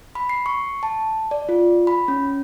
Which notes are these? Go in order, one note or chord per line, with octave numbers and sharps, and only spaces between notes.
B5
C7
C#6
A5
D5
F4
B5
C#4